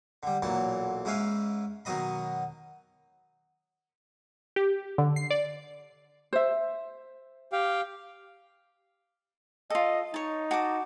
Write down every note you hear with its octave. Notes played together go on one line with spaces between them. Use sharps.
D3 G3
B1 A#2 E3 F#3 A5
G#2 C#4 E4 B4 F5
B2 D#3 F#3 D#5 B5
G4
D3
C7
D5
C5 E5
G4 F5 G5
F4 A4 D#5
D#4 C#5 A5
F#4 A5 D6